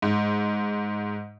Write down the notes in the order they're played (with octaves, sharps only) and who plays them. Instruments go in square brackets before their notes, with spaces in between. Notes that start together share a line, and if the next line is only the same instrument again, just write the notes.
[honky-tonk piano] G#2